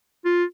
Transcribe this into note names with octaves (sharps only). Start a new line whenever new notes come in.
F4